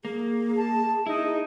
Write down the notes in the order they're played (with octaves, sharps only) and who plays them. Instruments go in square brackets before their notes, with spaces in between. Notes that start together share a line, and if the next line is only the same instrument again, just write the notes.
[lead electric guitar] A#3 [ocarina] G#4
[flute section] A5
[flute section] D#4 [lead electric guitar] E4